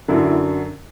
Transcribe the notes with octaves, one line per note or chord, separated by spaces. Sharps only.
F#2 D3 F#3 E4
E4